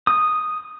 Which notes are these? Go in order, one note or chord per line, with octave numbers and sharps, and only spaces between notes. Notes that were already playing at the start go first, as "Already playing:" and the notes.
D#6